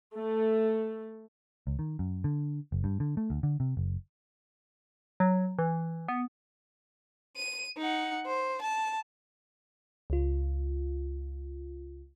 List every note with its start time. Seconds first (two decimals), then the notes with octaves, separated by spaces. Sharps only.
0.15 A3
1.67 C#2
1.79 D#3
1.99 F#2
2.24 D3
2.72 F#1
2.84 G2
3.00 D3
3.17 A3
3.30 D2
3.43 D3
3.60 C3
3.77 F#1
5.20 F#3
5.59 E3
6.08 B3
7.37 D#7
7.78 D#4 F#5
8.26 C5
8.62 A5
10.10 C#2 F4